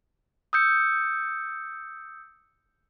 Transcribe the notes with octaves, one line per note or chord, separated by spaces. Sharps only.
D#6 E6 G6 C#7